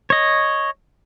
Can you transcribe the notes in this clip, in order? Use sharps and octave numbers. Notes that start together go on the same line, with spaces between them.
C#5 D#5